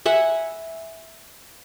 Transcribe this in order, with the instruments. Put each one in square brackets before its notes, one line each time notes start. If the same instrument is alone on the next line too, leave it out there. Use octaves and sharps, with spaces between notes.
[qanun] E5 F#5 G#5 B5